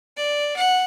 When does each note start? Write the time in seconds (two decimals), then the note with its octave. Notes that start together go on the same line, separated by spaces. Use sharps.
0.17 D5
0.56 F#5